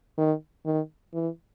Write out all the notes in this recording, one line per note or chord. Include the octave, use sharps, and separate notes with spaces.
D#3
D#3
E3